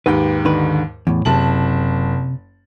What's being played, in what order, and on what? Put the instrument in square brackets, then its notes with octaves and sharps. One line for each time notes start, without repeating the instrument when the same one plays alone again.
[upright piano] D#2 G#2 G4 [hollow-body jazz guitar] B4 G5
[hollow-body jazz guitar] D3 D#3 B4
E2 A2
[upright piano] F#1 A5 F#7 [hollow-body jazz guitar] C3